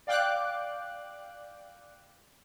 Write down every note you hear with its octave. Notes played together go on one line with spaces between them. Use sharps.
D5 F5 G5 D6 F#6